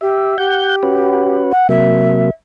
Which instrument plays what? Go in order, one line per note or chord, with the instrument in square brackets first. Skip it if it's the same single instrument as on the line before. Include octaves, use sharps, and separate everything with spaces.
[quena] G4 [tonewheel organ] E5
[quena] G4 [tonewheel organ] F#5 G6
[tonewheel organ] C#4 F#4 B4
[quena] F#5
[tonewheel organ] C3 F#3 A#3 [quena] E5